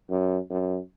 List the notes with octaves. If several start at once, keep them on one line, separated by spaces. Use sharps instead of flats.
F#2
F#2